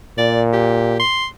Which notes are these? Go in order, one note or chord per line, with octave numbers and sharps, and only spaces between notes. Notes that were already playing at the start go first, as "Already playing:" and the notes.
A#2 D5
G4
C6